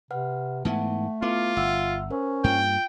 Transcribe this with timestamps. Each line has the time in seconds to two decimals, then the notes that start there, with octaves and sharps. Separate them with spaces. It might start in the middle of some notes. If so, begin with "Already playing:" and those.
0.11 C3 B4 F#5 F6
0.65 G#2 E3 A3 B3 F#5 A5
1.22 B3 E4 F4 A4 D6
1.57 G1 E5 F#5 E6
2.11 C#4 A#4 C5
2.44 G2 A#3 F4 G5